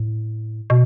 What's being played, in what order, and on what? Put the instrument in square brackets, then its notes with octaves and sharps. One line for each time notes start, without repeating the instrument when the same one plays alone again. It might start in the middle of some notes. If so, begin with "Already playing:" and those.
Already playing: [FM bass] A2
B2